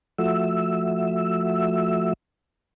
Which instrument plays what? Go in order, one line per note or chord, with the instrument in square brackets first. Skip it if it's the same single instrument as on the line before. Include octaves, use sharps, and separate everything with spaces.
[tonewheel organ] F3 A3 F#4 E5 E6